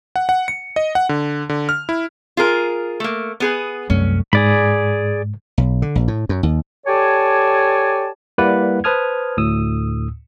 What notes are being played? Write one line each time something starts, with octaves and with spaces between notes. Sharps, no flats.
F#5
F#5
C#7
D#5
F#5
D3
D3
F6
E4
F4 G#4 A#4
A3 A#3
B3 G#4 B4
C2 F#2 A3 C#4
G#2 G#4 D5 B5
B1
D3
A#1
A2
F#2
D#2
G4 A4 C#5 D5 G#5 A5
G3 A#3 E4 B4 D5 F#5
B4 C5 A5 D#6 F6 G#6
D2 A2 D#6 E6